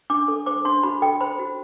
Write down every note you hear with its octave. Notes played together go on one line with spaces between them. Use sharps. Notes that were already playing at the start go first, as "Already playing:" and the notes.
D4 D6
A4
C5 D6
D4 C6
F#4 B5
A4 G5
C5 B5
F#4